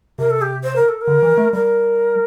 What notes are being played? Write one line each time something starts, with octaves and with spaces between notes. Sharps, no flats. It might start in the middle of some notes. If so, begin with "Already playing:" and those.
C3 A#4
A4
G4
C5
A#4
A4
A#4
D3
E3
A3
G3 A#4